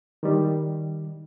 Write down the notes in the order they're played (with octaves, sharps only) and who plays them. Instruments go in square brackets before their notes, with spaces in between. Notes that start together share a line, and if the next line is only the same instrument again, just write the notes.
[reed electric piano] D#3 G3